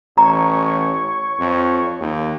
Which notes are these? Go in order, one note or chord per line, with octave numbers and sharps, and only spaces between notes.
A1 C#5 A#5
F2
D#2